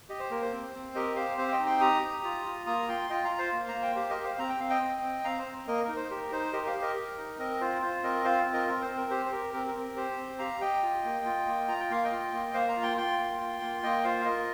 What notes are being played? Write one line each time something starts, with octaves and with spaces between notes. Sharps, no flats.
G4 D#5
C5
A#3 A#4
C5
C4
C4
G4 A#4 D#5
G4 C5 F5
C4 C5 F5
F5
D#5 G5
D#4
G5 C6
G4 A#5 D#6
G4
F4
F4
A#3 A#5 D#6
F4 G5 C6
F4 D#5 G5
F5 A#5
F4
C5 F5
A#3
A#5
A#3
G5
G4 C5 F5
A#4 D#5
G4
C5 F5
C4 A#5
G5
C4 F5
D#5 G5
C4
C4
C4 F5 A#5
C5
C4
A#3 A#4 D#5
D#4 A#4
C5
G4 A#4
D#4 C5
G4 A#4 D#5
C5 F5
G4
A#4 D#5
G4
D#4
C4 A#4 D#5
F4 C5
F4 C5
C4 A#4 D#5
F4 C5 F5
C4
A#4 D#5
C4 A#4
C5
C4
A#4
G4 C5
C5
G4 A#4
C4 A#4
A#4
C4
G4 C5
C4
G4 F5 A#5
G4 D#5 G5
F4
A#3
F4
A#3
F4 A#5
G5
A#3 F5
D#5 G5
F4
A#3
A#3 C5 F5
F5 A#5
F4
G5 C6
F4 G5 C6
A#3
F4
A#3
A#3 D#5 G5
F4 C5 F5
F5
F4 A#4 D#5